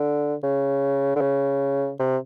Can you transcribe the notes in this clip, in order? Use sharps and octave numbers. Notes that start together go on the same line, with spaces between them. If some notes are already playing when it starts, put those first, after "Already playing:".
Already playing: D3
C#3
D3
C#3
C3